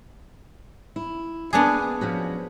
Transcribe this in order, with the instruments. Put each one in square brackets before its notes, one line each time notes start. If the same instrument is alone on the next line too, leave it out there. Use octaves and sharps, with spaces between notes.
[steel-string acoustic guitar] E4
[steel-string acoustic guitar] A#3 G#5 [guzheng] B3 D4 G#4
[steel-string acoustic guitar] F3 C#4 F#4